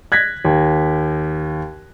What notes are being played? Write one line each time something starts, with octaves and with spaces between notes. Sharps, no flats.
F#6 G#6 A#6 B6
D#2